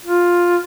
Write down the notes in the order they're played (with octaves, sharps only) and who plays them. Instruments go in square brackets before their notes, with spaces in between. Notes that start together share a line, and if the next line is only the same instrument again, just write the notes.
[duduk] F4